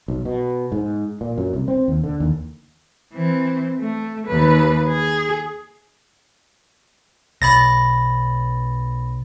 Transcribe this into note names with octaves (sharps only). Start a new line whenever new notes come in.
B1
B2
G#2
A#2
F#2
C2
C4
D#2
D3
D#2
E3 C4
A3
D#2 B4
G#4
B1 B5 A6 A#6